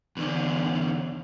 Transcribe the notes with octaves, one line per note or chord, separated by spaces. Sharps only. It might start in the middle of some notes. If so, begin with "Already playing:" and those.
E2 D3